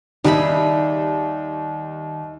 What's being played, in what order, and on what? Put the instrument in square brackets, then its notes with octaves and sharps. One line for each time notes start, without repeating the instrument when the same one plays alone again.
[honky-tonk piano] D#2 [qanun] G3 G#4 B5 [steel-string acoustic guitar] D#4 E5